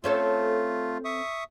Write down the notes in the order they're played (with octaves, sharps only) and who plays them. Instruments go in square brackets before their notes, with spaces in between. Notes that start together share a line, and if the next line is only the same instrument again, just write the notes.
[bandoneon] A3 F4 [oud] C4 C#4 A4
[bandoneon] E5 C#6 D#6